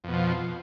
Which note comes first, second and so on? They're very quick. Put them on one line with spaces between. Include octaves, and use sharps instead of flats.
F2 B2 F3